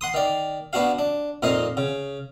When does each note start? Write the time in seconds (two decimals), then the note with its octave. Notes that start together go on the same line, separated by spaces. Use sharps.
0.01 F#5 C6 D#6
0.14 D#3 D5
0.73 B3 D4 F#4 F5
0.99 D4
1.43 F2 A#2 D#4 D#5 F5
1.77 C#3